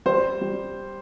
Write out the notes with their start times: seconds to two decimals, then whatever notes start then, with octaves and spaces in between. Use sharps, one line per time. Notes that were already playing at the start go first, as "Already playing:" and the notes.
0.06 G3 C5
0.42 G3